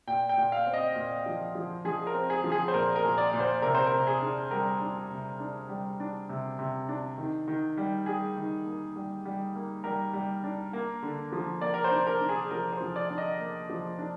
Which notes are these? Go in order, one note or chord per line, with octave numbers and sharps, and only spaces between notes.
A#2 G5
G5
A#2
F5
C4
D#5
A#2
F3
F3
F3 G#4
A#4
C4
G#4
F3
G#4
C5
A#2 A#4
A#4
A#2
D5
A#2
C5
C3 A#4
C5
A#4
C3
G#4
D4
G3 A#4
D4
C3
D4
G3
D4
C3
C3
D4
D#3
D#3
G3
G3 G#4
D#3
A#3
G3
G3
A#3
G3 A#4
G3
D4
A#3
D3
F3
A#3 D5
A#4
C5
D4
A#4
D4
G#4
F3 A#4
C5
F3
D5
D4
D#5
A#3
F3
D4